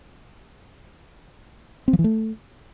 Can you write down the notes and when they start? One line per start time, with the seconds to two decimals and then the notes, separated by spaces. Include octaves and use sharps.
1.88 C4
1.93 F3
1.99 E3
2.04 A3